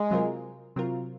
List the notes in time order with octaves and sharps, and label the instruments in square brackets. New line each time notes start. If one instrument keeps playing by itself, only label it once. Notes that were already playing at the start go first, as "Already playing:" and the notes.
Already playing: [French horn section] G#3
[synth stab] C3 F#3 C4 F4 A#4
C3 F#3 C4 F4 A#4